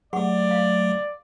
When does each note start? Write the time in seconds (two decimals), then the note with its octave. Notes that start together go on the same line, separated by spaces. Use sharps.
0.13 F#3 A3 G4 G#4 D5 F#5
0.51 F5